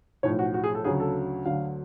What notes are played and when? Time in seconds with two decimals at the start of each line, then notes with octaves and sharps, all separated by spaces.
0.23 B1 A2 F3 C#5
0.39 F#4
0.54 F#4
0.64 G#4
0.75 A4
0.84 D2 C#3 F#3 G#4
1.00 A4
1.46 D2 D3 F#3 F5